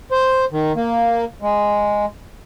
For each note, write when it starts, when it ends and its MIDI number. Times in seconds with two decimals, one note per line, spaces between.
0.11 0.45 72
0.52 0.73 51
0.76 1.25 58
1.42 2.06 56